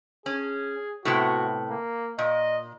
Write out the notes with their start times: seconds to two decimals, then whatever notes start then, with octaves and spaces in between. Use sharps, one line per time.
0.26 C#4 G#4
1.05 A2 C3 B3 F#4
1.70 A#3
2.19 A#2 D#5